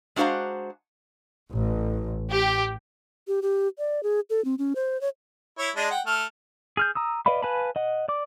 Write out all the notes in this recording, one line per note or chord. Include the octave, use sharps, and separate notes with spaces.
G#3 D4 F#4 C5 F5 A#5
A1
G4
G4
G4
D5
G#4
A4
C4
C#4
C5
C#5
E4 C#5
G#3 D4 D#5
F#5 G5
A3 F6
G#4 F6 G6
A#5 D#6 E6
B4 D5 D#5 F5 B5
B4 F5 G#5 A5 B5
D#5 F#5
D5 D6